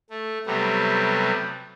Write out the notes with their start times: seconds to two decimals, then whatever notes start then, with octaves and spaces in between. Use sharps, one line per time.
0.10 A3
0.46 C3 F#3 G3 A3 B3